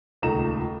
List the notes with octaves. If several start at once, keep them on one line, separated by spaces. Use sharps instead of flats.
D#1 C#2 A3 D#4 A#5 E7